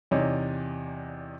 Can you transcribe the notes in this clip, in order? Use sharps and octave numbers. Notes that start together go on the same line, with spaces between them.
E2 C3 D#4 C#5 D5